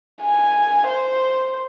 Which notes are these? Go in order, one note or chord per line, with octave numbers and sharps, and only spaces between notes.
G#5
C5